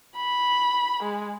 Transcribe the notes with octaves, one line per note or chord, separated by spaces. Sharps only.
B5
G#3